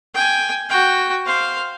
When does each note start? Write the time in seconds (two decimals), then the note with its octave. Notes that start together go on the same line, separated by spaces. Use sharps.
0.14 G5 G#5
0.69 F#4 G5
1.26 C5 F5